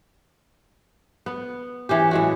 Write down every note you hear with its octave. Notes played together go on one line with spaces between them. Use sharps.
B3
E3 C#4 G4
A2 G#3 F#4